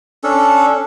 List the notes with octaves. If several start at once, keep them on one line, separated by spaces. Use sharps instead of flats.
C#4 D4 A4